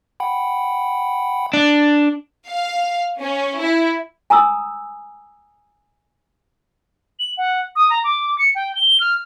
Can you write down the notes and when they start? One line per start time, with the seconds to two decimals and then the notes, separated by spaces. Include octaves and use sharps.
0.20 F#5 G5 B5
1.54 D4
2.49 F5
3.20 C#4
3.60 E4
4.30 G#5 A#5 D#6 E6
7.19 F#7
7.37 F#5
7.76 D#6
7.90 A#5
8.04 D6
8.39 C#7
8.55 G5
8.75 G7
9.00 F6